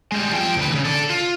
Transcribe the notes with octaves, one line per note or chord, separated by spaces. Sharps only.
G3 G#3
F3 G5
D2 B4
C#3 E3
A4 D5
F4